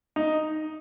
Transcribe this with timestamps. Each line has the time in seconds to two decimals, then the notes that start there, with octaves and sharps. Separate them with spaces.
0.16 D#4